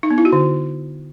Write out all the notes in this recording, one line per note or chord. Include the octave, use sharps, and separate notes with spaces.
D#4
B3
E4
F#4
D3